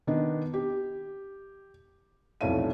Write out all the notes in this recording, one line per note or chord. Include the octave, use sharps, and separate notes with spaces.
D#3 B3 D4 D#4
G4
F1 B1 A2 E5 F5 D#7